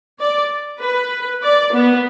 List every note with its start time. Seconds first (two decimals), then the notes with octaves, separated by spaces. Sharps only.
0.19 D5
0.80 B4
1.42 D5
1.73 B3